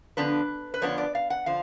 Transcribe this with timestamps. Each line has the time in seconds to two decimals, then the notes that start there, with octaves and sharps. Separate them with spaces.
0.17 D3 F3 B3 D4 B4
0.74 B4
0.81 D3 F3 B3 D4 C#5
0.98 D5
1.15 F5
1.30 F#5
1.46 D3 F3 F5